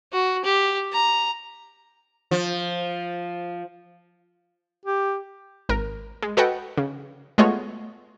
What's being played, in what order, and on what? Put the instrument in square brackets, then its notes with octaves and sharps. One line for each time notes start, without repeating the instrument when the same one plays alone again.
[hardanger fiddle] F#4
G4
A#5
[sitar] F3
[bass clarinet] G4
[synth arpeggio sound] G#1 A#4
G#3
F#4 A4 B4 D#5 F#5 G5
C#3
G#3 A3 B3 F4 F#4 C#5